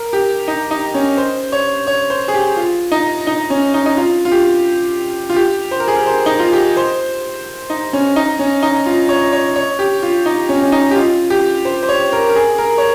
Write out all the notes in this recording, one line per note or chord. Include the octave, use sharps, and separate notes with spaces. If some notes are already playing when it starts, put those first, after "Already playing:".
Already playing: A#4
G4
D#4
D#4
C#4
C5
C#5
C#5
C5
G#4
G4
F4
D#4
D#4
C#4
D#4
D#4
F4
F4
G4
F4
G4
C5
A#4
G#4
A#4
C5
D#4
F4
G4
C5
D#4
C#4
D#4
C#4
D#4
F4
C#5
C#5
C#5
G4
F4
D#4
C#4
C#4
D#4
G4
F4
G4
C5
C5
C#5
A#4
A#4
G#4
A#4
C#5